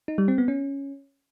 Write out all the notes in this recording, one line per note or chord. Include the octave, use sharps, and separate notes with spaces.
D#4
G3
C4
B3
C#4